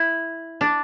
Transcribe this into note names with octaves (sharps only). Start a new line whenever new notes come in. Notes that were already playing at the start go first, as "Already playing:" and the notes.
Already playing: E4
D4